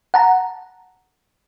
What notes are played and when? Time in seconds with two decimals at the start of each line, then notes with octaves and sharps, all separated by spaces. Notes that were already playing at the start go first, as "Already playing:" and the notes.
0.14 F#5 A5 A#5